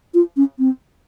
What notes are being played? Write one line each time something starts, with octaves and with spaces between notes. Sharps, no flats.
F4
C#4
C4